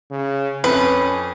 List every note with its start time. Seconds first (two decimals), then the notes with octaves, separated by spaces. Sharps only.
0.11 C#3
0.64 F2 C#4 B4